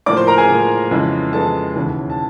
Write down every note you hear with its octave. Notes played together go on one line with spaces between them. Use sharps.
A2 F3 A#3 D5 D6
C5 C6
A#4 A#5
G#4 G#5
A2 F3 A#3
F2 C#3 E3 G#3 B3
F2 C#3 E3 G#3 B3 A4 A5
E1 D#2 C#3 E3
A5